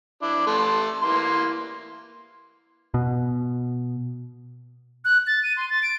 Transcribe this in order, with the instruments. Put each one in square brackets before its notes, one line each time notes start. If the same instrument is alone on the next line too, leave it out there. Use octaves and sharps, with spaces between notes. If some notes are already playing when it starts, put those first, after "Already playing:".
[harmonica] D4 E4
A3 A5 C6
E3 A#3 C6
[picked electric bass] B2
[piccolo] F#6
A6
D#7
C6
A6
D7